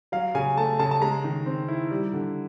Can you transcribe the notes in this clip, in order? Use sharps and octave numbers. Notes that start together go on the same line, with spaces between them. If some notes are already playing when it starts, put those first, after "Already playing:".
F#3 F5
C#3 G#5
A3 A5
C#3 A5
A5
G#3 A#5
D#3
C4
E4
G3
D3